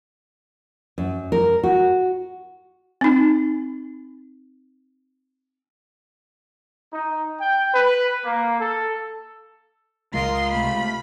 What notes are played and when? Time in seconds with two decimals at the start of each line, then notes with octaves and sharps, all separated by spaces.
0.98 F#2
1.32 A#4
1.63 F#4
3.01 C4 D#4
6.93 D#4
7.40 G5
7.74 B4
8.25 A#3
8.61 A4
10.14 C#2 C#3 G#3 F4 A#4 D#5 A#5 C6
10.52 C3 A3 B5